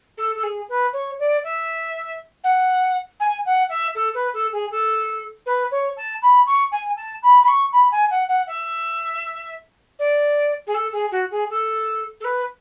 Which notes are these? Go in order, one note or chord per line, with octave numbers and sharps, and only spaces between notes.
A4
A4
G#4
B4
C#5
D5
E5
F#5
G#5
F#5
E5
A4
B4
A4
G#4
A4
B4
C#5
A5
B5
C#6
G#5
A5
B5
B5
C#6
B5
G#5
F#5
F#5
E5
D5
G#4
A4
G#4
F#4
G#4
A4
A4
B4